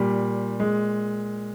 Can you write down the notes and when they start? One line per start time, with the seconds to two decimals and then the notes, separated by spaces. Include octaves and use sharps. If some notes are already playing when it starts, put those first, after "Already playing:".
Already playing: A#2 G3
0.60 G#3